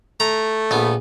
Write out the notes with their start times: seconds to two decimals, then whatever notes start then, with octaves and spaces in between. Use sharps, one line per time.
0.20 A3 A#5
0.71 A#1 B3